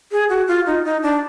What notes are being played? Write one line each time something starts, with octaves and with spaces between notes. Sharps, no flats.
G#4
F#4
F4
D#4
D#4
D4